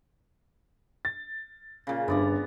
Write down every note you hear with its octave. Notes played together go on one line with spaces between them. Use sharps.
A6
A#2 C#3
G1 G2 B3 D5 A#5